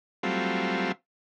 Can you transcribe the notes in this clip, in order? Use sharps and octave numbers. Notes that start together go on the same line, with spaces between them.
F#3 G3 A3 C4 F4